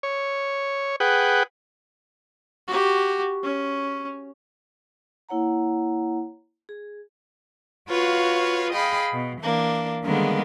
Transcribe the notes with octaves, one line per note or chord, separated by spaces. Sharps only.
C#5
G#4 B4 F#5 G5
F#4 G4
C#4
A#3 E4 C#5 F#5 A#5
G#4
F4 F#4 B4 C#5 F5
G#4 D#5 F5 G5 B5
B2
E3 A#3 D4
D3 D#3 G3 G#3 A#3 B3